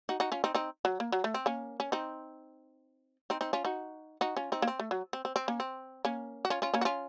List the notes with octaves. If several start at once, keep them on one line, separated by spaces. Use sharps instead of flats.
D#4 F#4
D#4 F#4
C#4 F4
C4 D#4
C4 D#4
F#3
A#3
F#3
A3
C4
A#3 C#4
C#4
C4 D#4
C4 D#4
C4 D#4
C#4 F4
D#4 F#4
D#4 F#4
C#4 F4
C4 D#4
A#3
C4
A3
F#3
C4
C4
C4
A#3 C#4
C4
A#3 C#4
F#4
C#4 F4
C#4 F4
A#3 C#4
F#4
C#4 F4